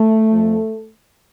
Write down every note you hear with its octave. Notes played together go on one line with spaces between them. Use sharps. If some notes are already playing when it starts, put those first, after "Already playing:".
Already playing: A3
F2 F3